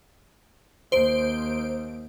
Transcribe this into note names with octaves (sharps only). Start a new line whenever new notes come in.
D#2 C5 D7